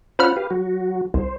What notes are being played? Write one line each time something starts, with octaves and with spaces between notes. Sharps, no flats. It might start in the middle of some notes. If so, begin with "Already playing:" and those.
C#4 F4 C5 F#5 B5 F6
G4 B4 F5
F#3 F#4
C2 C5